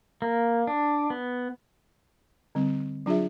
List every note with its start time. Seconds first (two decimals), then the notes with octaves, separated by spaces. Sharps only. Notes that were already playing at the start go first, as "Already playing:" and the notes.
0.22 A#3
0.67 D4
1.10 B3
2.55 D3 G3 C4
3.06 F#3 D4 F4 G#4 E5